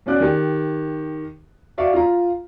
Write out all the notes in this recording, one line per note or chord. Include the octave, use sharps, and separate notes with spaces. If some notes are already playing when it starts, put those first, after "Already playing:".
E2 C#4 F#4 D5 F#6
D#3 G4
F#4 D5 E5 F5 C#6
F4 A#5